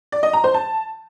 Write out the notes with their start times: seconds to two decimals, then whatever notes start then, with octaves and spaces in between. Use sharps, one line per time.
0.12 D5
0.23 D#5
0.33 A#5
0.44 C5
0.54 A5